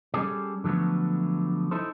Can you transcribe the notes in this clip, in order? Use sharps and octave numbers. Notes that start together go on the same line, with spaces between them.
G3 C#4 G#4 A4 D5
D3 F3 F#3 A3 B3
D#4 E4 A4 C5